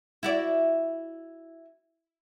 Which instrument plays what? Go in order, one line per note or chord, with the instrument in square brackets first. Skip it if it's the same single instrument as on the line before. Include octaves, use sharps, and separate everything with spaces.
[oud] E4 F#4 D5